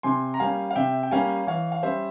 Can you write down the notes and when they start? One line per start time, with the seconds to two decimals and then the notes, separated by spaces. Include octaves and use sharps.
0.03 C3 G#5 C6
0.34 A#5
0.39 G3 A#3 C#4 F5 G#5
0.71 F5
0.76 C3 E5 G5
1.03 G5
1.11 G3 A#3 C#4 F5 G#5
1.47 E3 C#5 F5
1.72 F5
1.83 G3 C#4 C5 E5